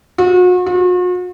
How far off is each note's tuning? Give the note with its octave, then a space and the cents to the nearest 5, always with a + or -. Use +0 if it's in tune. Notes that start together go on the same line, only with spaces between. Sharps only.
F#4 -40
F#4 -45